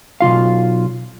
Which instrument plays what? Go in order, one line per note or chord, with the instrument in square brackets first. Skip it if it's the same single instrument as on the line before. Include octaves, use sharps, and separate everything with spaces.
[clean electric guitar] B1 F#2 F4 F5